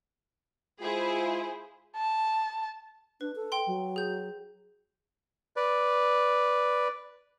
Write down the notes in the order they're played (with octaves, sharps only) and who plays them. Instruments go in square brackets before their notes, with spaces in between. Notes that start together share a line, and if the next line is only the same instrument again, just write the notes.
[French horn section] G#3 F4 [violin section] E4 G#4 C5
[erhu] A5
[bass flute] D4 [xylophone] B4
[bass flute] A4
[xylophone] G5 C6
[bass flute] F#3
[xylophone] G#4 G6
[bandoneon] B4 D5